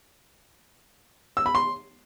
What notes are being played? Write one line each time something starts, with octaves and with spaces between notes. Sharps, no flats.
E6
B5
C6